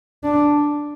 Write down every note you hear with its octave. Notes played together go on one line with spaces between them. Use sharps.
D4